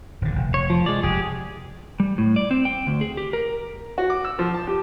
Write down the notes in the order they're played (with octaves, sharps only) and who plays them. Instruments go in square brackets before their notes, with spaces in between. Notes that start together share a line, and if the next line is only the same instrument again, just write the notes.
[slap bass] D#1 D3
F1
[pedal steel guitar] C#5
F3
G#3 D5
[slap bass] F1 [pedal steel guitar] G4 G#4
[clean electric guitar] G3
A2
D5
C4
G5
D2
G#4
G4
A#4
[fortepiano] F#4
D6
E6
F3
A5
G4